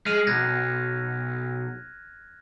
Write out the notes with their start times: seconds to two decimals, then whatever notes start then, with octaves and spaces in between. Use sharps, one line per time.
0.06 G#3 F6 D#7 F7
0.27 B1 F#6 G#6 A#6